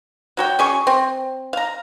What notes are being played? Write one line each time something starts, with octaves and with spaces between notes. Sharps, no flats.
F#3 F#4 G5
C#4 G#4 C#6
C4
F5 A#5